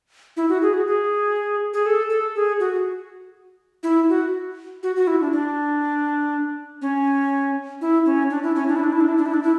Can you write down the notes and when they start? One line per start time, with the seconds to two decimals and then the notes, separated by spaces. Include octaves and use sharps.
0.37 E4
0.49 F#4
0.62 G#4
0.74 F#4
0.87 G#4
1.73 G#4
1.86 A4
2.10 A4
2.35 G#4
2.60 F#4
3.83 E4
4.09 F#4
4.83 F#4
4.96 F#4
5.07 E4
5.21 D4
5.32 D4
6.82 C#4
7.81 E4
8.06 C#4
8.30 D4
8.43 E4
8.55 C#4
8.68 D4
8.76 E4
8.84 D4
8.92 E4
9.00 D4
9.09 E4
9.17 D4
9.26 E4
9.34 D4
9.43 E4